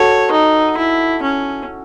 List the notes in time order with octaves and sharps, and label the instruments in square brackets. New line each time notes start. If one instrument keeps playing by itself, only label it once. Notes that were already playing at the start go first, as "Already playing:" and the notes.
Already playing: [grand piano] F#4 A4 [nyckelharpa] C#5
[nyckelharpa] D#4
E4
C#4